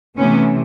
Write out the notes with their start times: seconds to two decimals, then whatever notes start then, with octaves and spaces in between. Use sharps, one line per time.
0.17 C3 E3 A3 B3 C#4